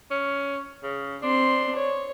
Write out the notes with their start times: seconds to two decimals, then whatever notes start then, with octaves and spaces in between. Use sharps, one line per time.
0.11 C#4
0.83 C#3
1.23 C4 D4 C6
1.76 C#5